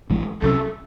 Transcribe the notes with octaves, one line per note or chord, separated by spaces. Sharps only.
A1 A2 E3 G#3
C2 C3 F#3 C#4 A4